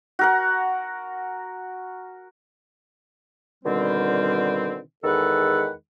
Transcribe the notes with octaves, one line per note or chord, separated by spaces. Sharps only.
F#4 A#4 F#5
B2 D3 D#3 G3 C4
E2 D#3 G#3 A4 B4 F#5